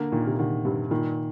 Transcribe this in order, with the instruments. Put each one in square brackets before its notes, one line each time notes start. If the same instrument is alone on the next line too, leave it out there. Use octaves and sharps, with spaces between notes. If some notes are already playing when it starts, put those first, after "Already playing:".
Already playing: [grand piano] D3 [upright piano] A#3
[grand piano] A#2 [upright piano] D#3
[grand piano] C3
[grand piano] D3 [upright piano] D#3
[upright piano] G2 [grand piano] C3
[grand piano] A#2 [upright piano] D#3